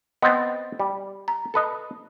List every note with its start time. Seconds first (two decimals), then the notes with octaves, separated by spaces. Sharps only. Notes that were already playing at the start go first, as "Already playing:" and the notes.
0.22 B3 C4 D#5 G5 A6
0.80 G3
1.28 A#5
1.54 A4 B4 D#5